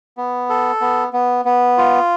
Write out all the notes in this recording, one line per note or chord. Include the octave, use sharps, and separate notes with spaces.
B3
A4
B3
B3
B3
F4